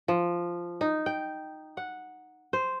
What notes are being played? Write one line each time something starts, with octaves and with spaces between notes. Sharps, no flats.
F3
D#4
G5
F#5
C5